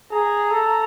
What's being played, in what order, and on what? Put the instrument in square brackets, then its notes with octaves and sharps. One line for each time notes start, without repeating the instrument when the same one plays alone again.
[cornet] G#4 [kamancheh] A#5
[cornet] A4